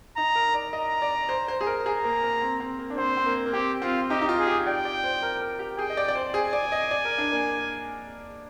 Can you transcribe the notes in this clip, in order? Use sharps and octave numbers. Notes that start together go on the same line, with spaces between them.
D#4 A#5
A#4
D5
D#5 A#5
D5
C5
C5
G#4
A#4
G#4 A#5
A#3
A#3
C4
C4
A#3
D4
C4 C5
C4
A#3
A#3
C4 G4
C4 F4
D#4 G4
D#4
F4
G#4
G4
D5 G5
D5
C5
A#4
A#4
G4
G#4 G5
D#5
D5
D5
C5
G#4 G#5
D5
D#5
D5
A#4
D4
A#3